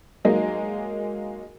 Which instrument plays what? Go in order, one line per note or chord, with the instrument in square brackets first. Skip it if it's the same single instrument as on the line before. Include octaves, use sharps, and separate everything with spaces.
[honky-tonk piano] F#3 G#3 A#3 D#4